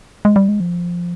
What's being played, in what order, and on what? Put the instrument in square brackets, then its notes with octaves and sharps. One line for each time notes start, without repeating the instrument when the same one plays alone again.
[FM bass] G#3
G3
G#3
F3